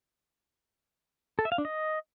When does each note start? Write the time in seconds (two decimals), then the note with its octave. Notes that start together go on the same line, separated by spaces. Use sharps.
1.39 A4
1.45 E5
1.52 F5
1.58 D4
1.65 D#5